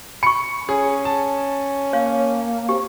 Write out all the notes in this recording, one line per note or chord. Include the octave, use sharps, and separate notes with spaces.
B5 C#6 C#7
C#4 G#4
A5
A#3 C#5 F5
C4 G4